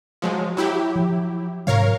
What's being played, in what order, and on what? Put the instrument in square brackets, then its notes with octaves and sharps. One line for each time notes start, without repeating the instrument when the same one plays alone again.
[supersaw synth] F3 F#3 G#3
F#3 E4 G4
[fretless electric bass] F3
[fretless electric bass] G#2 C3 F#3 [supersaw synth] A#4 C#5 F5